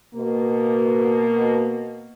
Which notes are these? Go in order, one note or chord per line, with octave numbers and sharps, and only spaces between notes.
B2 A#3